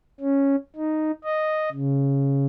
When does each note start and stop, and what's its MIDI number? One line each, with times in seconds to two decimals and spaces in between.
0.20 0.56 61
0.76 1.12 63
1.24 1.69 75
1.72 2.46 49